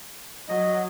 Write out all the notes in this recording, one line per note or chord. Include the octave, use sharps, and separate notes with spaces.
F#3 D#5